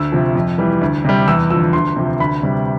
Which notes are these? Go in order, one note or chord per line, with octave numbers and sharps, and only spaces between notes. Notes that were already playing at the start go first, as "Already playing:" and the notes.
Already playing: D2 E6
C3 F3
F2
E3 G3
D2
C3 G3
E2 E6
D3 F3 E6
D2 C6
C3 F3
D2 B5
C3 G3